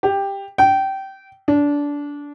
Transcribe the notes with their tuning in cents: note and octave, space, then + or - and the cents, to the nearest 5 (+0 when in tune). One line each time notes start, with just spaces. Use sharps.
G4 +10
G5 -20
D4 -20